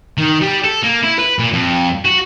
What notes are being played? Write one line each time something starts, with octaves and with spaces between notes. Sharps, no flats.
D#3
G3
A4
A#3
E4
B4
A#2
F2
F#4